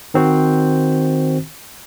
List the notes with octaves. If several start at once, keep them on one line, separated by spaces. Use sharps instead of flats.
D#3 C4 F#4 C5